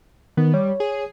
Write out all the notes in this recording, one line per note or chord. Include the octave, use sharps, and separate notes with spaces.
D#3 B3
G3 C#5
G#4